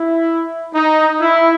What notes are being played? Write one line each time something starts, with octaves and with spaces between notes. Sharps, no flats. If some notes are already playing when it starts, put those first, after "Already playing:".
Already playing: E4
D#4
E4